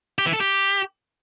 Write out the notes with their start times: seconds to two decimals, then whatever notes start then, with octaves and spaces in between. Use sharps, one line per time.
0.18 G4
0.26 E3
0.33 A4
0.41 G4